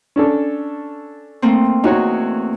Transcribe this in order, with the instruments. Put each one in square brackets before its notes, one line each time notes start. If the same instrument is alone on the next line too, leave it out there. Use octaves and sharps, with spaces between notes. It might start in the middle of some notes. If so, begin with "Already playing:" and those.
[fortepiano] C#4 D4 A4
[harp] A3 A#3 C4
[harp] E2 [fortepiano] D#4 F#4 C#5